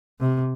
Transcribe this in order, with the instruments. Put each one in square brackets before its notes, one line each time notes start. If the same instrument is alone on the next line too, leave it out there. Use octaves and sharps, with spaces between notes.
[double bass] C3